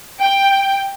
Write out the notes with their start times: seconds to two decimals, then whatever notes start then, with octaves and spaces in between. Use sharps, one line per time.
0.20 G5